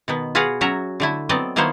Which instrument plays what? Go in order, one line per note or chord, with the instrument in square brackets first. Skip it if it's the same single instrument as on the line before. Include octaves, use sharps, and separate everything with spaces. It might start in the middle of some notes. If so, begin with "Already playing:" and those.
[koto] B2 D#3 B3
F4 F#4 G#4 B4 F5 F#5
F#3 C#4 F#4 E5 A#5
D3 A3 E4
F#3 B3 C4 D5 D#5
D#3 A#3 B3 E4 C5 C#5